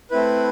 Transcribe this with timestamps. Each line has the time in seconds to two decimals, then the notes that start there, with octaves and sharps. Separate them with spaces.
0.11 A3 C4 E4 B4